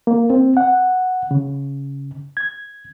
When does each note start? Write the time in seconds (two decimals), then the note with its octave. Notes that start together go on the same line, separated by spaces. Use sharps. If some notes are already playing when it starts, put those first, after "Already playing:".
0.07 A#3
0.30 C4
0.57 F#5
1.31 C#3
2.37 G#6